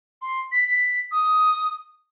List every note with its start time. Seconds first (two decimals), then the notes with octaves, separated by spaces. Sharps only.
0.22 C6
0.52 B6
0.67 B6
1.11 D#6